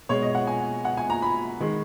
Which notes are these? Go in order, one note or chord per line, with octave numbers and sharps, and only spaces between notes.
B2 G#3 C#5
D#5
F#5
G#5
F#5
G#5
A#5
B5
D#3 G#3